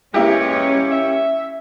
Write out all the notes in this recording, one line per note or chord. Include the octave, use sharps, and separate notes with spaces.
E2 G#3 A#3 C#4 E4 G4 C#5
E5